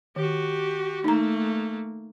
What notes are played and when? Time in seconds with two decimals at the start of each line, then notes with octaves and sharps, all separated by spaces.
0.16 D#3 F#4 G4
1.04 A3 A#3 D#4 A#5